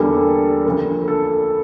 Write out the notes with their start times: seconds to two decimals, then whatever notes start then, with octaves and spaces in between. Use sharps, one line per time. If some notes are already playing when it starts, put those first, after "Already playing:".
Already playing: E2 D3 G3 A#3 A4
0.66 D2 D3 F3 A#3
1.08 A4